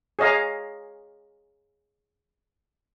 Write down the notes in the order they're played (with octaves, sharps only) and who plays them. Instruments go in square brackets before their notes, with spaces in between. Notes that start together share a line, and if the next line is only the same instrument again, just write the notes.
[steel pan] G#4 C#5 D#5 F5 A#5